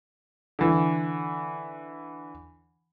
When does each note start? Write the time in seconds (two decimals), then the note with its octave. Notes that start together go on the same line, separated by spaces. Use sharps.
0.59 D3 E3